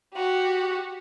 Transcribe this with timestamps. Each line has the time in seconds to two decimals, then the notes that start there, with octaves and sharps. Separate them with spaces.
0.12 F#4 G4